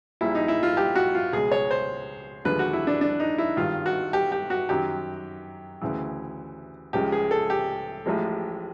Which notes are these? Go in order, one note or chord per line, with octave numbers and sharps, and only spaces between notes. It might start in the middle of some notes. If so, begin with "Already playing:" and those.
A#1 A#2 G3 E4
D#4
E4
F4
G4
F#4
F4
C#2 B2 G#3 G#4
C#5
C5
D#2 D3 F3 G#3 B4
F#4
E4
D4
D4
D#4
E4
G#1 G2 D#3 F4
F#4
G4
G4
F#4
F#2 D#3 F#3 G4
D2 C#3 E3
C#2 C#3 F3 G#3 G4
G#4
A4
G4
A1 A2 F3 G#3